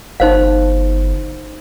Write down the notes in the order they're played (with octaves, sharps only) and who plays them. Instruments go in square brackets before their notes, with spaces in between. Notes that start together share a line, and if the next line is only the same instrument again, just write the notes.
[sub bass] G1 [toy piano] D#4 C5 F5